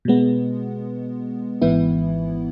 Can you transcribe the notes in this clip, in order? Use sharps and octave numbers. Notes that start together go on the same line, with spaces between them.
B2 G#3 B3
G#1 G#2 E3 B3 E4